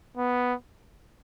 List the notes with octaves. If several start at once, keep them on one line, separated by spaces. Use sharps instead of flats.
B3